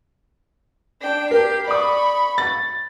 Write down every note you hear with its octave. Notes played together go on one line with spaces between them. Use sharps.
D4 G5
G4 A#4 C7
D5 B5 C#6 D#6
A6